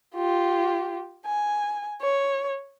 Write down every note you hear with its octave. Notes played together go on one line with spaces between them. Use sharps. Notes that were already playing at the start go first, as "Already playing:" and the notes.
F4 G4
G#5
C#5